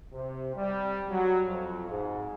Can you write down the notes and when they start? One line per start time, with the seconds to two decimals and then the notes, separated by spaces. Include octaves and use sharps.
0.13 C3
0.56 G3
1.10 F#3
1.46 F2
1.90 G#2